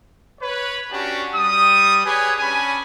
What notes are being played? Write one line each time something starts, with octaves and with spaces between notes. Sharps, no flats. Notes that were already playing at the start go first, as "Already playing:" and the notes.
B4 C#5
C#4 D4 F#4 G4
G3 D#6
G4 G#4 B4 C#5 G#5
C#4 D4 G#5 B5